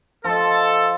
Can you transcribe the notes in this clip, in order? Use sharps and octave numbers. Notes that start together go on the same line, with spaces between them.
F3 A4 D#5